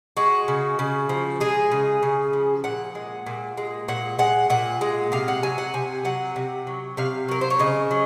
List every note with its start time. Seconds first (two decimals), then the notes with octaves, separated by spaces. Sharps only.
0.17 G#3 F#4
0.48 C#3
0.79 C#3
1.09 F3
1.40 G#3 G#4
1.71 C#3
2.03 C#3
2.33 F3
2.64 A#2 F#5
2.95 G#3
3.26 A#2
3.57 G#3
3.88 A#2 F#5
4.19 G#3 F#5
4.50 A#2 F#5
4.81 G#3
5.12 C3 F5
5.28 F#5
5.43 F#3 G#5
5.58 F#5
5.74 C3 G#5
6.05 F#3 F#5
6.36 C3
6.67 F#3
6.97 C3 F5
7.28 F#3 A#4
7.41 C5
7.50 C#5
7.59 C#3 D#5
7.91 F#3